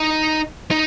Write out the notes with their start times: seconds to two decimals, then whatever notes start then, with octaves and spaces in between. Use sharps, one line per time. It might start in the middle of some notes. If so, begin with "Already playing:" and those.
Already playing: D#4
0.71 D#4